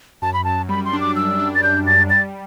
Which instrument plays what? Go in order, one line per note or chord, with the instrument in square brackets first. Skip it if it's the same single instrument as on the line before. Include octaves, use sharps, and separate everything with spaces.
[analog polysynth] F#2 [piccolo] A5
[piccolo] B5
[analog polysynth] F#2 [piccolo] A5
[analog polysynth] G3 [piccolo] B5
[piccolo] C6
[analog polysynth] D4
[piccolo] D6
[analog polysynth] F#2 [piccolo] E6
[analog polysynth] D4
[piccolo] A6
[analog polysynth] D4 [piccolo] G6
[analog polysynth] F#2 [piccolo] A6
[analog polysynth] G3 [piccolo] A6